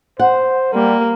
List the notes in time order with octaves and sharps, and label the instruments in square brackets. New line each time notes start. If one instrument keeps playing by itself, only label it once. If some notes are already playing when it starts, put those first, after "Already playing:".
[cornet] C5 [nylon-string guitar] F#5
[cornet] G3 [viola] A#3